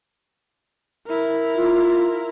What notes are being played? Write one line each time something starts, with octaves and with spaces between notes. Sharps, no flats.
E4 A#4
F4